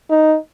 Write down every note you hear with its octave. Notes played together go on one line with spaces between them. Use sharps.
D#4